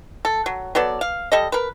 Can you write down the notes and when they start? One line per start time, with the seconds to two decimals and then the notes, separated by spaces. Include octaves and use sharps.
0.25 A4
0.46 F#3
0.75 F#3 B3 A4 D5
1.01 F5
1.32 G3 A4 D#5
1.52 A#4 B4